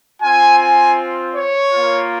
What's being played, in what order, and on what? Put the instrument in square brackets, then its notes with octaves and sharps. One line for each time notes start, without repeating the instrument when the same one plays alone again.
[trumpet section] C4 F4 G#5
G#5
C#5
A#3 F4